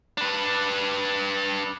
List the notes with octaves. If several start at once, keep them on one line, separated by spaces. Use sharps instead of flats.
D4 B4